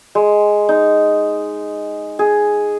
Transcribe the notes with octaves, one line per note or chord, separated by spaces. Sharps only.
G#3
D#4
G#4